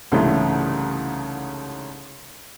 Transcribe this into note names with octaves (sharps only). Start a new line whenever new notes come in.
C2 G#2 C#3 E3 A3